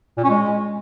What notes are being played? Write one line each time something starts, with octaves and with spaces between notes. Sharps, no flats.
A#2
C#4
G#3